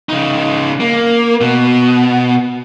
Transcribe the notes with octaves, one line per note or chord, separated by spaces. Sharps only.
C#3 D#4
A#3
B2